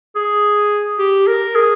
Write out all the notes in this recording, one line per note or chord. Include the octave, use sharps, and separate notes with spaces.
G#4
G4
A#4
G#4